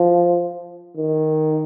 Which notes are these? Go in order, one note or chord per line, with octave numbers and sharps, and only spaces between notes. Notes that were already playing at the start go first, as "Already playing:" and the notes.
Already playing: F3
D#3